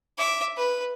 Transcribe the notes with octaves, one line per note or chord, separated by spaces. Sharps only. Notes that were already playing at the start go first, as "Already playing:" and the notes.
E5 D6
B4